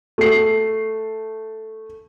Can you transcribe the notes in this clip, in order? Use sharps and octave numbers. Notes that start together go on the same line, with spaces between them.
A3 C7